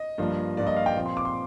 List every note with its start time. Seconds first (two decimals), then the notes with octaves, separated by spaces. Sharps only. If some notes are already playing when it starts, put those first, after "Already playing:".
Already playing: D#5
0.18 G2 F3 A#3 D4
0.57 G2 F3 A#3 D4 D5
0.67 D#5
0.76 F5
0.86 G5
0.95 A#2 F3 C4 F4
1.06 C6
1.17 D6
1.25 C6